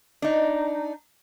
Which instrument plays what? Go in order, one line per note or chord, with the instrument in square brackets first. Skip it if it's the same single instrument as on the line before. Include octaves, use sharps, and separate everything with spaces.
[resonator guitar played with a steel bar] D4 D#4